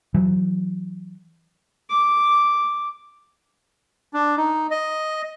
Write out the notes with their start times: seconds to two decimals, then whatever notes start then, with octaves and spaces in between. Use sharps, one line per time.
0.14 E3 F#3
1.90 D6
4.14 D4
4.37 D#4
4.71 D#5